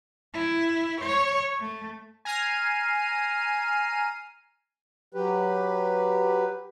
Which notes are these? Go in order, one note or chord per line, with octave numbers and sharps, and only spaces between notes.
E4
C#5
A3
G#5 A#5 F6 C7 D#7
F#3 G4 B4